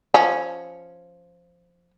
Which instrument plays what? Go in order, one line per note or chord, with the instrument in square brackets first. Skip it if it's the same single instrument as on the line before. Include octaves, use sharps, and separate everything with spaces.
[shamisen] F3 C#4